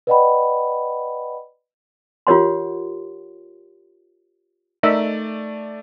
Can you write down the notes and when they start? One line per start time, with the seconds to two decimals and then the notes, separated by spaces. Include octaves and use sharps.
0.07 B4 D5 D#5 F#5 G5 B5
2.27 F4 G4 A#4 C#5 F#5 C6
4.83 A3 D#4 A#4 D5 E5